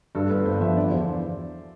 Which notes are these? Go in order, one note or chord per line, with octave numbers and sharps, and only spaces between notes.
G2 A4
G1 B4
G1 C5
F3 E5
D3 D5
E2 C5